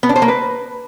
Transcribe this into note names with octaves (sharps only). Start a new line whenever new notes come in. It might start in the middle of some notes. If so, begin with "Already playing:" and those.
B3
D4
C5
A#3
B4